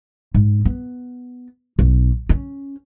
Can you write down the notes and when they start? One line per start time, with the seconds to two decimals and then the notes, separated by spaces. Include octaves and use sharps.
0.34 G#2
0.65 B3
1.79 B1
2.29 C#4